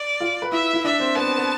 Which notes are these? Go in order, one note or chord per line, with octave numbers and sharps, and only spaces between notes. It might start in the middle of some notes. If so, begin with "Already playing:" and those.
Already playing: D5
F4
B4
E4 E5
E4
D4 E5
C4
B3 A5
C4
B3